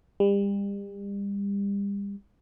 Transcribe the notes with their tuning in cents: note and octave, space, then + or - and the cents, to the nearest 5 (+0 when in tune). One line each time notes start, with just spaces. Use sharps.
G3 +35